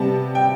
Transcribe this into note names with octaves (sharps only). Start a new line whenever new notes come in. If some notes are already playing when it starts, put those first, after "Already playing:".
Already playing: C3 G3 B3 A5
G5